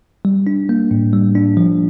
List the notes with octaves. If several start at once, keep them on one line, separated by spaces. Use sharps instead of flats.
G3
D4
A#3
A2
G3
D4
F3